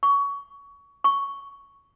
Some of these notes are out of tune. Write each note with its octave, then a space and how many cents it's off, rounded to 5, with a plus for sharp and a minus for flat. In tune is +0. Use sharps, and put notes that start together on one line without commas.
C#6 +20
C#6 +5